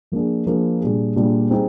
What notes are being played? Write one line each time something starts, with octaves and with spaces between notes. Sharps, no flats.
F3 A#3 D4 G#4
F3 A#3 D4 G#4
A#2 G3 D4 G#4
A#2 G3 D4 G#4
G3 C4 D#4 G#4